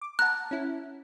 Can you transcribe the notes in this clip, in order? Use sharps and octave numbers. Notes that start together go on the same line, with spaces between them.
D6
F#5 A5 A#5 F#6
C#4 E4